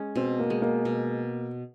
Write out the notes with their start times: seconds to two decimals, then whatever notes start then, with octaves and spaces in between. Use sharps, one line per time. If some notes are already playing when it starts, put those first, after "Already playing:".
Already playing: G#3 C#4
0.16 B2 C4
0.40 A#3
0.50 G#3
0.62 A#3
0.85 B2